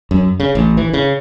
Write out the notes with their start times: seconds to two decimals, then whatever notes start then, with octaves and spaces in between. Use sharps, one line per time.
0.11 F#2
0.40 C#3
0.55 A1
0.77 E3
0.93 C#3